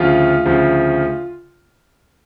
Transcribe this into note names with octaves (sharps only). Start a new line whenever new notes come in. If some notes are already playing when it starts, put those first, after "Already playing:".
Already playing: D2 C#3 F3 F4
D2 C#3 F3